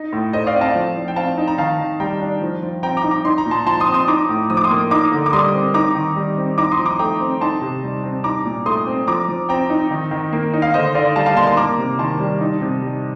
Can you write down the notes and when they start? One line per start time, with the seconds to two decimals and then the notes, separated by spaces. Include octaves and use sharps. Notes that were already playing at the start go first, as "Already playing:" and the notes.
Already playing: D#4
0.13 A2
0.33 A3 C5 D#5
0.47 D5 F5
0.55 C4
0.61 F5 A5
0.75 F3
0.96 F3
1.08 G5
1.16 C4 F5 A5
1.37 D#4
1.47 A#5
1.58 D#3 F5 A5
1.79 D#3
2.00 G3 G5 A#5
2.21 D4
2.42 F3
2.62 F3
2.83 C4 G5 A#5
2.97 A#5 D6
3.04 D#4
3.11 A#5 D6
3.25 D#4 C6
3.38 A#5
3.46 A#2
3.51 A5 C6
3.66 F3 A5 C6
3.80 C6 D#6
3.87 C4
3.94 C6 D#6
4.08 D#4 A#5 D6
4.29 A2
4.50 F3 D#6
4.57 D6
4.64 C6 D#6
4.71 A#3
4.91 D#4 A#5 D6
5.12 D3
5.26 D6
5.33 G3 C6 D#6
5.53 C4
5.74 D#4 A#5 D6
5.95 D#3
6.16 G3
6.37 C4
6.58 D#4 A#5 D6
6.72 C6 D#6
6.78 F3
6.85 A#5 D6
6.99 A3 G5 A#5
7.20 C4
7.41 D#4 A5 C6
7.62 C3
7.83 G3
8.04 C4
8.24 D#4 A#5 D6
8.45 A#2
8.66 A3 C6 D#6
8.87 C4
9.07 F3 A#5 D6
9.28 F3
9.49 C4 G5 A#5
9.70 D#4
9.91 D#3
10.11 D#3
10.33 A#3
10.53 D#4
10.62 F5
10.74 D3 C5 D#5
10.95 D3 D5 F5
11.16 G3 F5 A5
11.26 F5 A5
11.36 A#3 A5 C6
11.47 A5 C6
11.57 A#3 A#5 D6
11.78 C3
11.99 D#3 A5 C6
12.20 G3
12.41 D#4
12.61 C3
12.82 G3